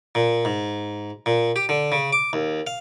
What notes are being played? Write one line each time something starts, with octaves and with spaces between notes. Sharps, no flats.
A#2
G#2
A#2
G4
D3
C#3
D6
D#2
F5